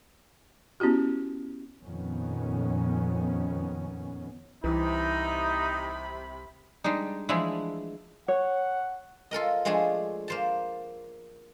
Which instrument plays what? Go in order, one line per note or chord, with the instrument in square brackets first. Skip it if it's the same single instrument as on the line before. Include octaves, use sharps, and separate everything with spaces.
[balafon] B3 C#4 E4 F#4 G4
[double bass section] F2 A#2 D#3 B3 C#4
[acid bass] C2 [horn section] C3 B5 [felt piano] E3 [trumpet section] D#4
[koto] G3 G#3 D4 D#4
E3 F3 G#3 A3 D4 E4
[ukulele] C#5 [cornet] F#5
[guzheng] F4 A4 A#4 D#5
F3 G#3 A3 D4 G#4
A#3 C5 A5